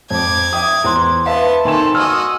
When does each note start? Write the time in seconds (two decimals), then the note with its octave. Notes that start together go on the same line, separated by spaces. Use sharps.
0.11 F2 D6 G#6
0.53 E5 G5 D#6
0.84 E2 E4 C5 C6
1.26 B3 B4 E5 F5 A5 C6
1.65 D#3 C4 A4 G#5 C6 C#6 E7
1.95 F#4 D#5 G#5 E6 F6